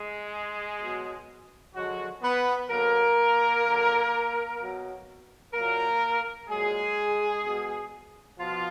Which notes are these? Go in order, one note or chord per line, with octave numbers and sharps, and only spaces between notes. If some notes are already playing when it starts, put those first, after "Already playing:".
Already playing: G#3 G#4
B2 F#3
D3 F3 F#3 G#3 F#4
B3 B4
D3 F#3 A#3 A#4
D3 F#3
B2 F#3
A#2 F#3 A#3 A#4
A#2 F#3 G#3 G#4
B2 G#3
B2 F3 F4